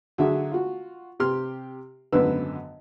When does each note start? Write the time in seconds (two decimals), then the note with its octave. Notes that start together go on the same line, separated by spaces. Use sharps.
0.18 D3 F#3 F#4 G#4 E5
0.52 F4 F#4
1.20 C3 G4 C6 F6
2.12 G#1 F#2 D3 B3 B4 E6